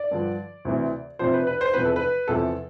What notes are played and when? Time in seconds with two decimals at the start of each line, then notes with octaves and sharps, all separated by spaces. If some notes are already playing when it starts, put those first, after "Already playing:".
Already playing: D5
0.11 G2 D3 F3
0.65 D2 C3 E3
1.19 F2 C3 F3 C5
1.33 B4
1.47 B4
1.61 C5
1.74 E2 C3 F3 B4
1.85 A4
1.96 B4
2.28 E2 C3 F3 A4